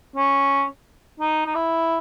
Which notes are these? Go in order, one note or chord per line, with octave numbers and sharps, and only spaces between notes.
C#4
D#4
D#4
E4